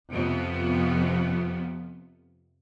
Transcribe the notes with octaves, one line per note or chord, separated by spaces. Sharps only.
F2 C3 F3 B3